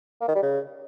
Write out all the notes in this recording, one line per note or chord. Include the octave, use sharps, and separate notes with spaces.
A#3
D#3
G3
C#3